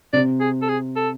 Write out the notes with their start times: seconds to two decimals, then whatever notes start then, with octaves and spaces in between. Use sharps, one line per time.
0.13 C3 D5
0.40 G#4
0.62 A4
0.69 G#4
0.96 A4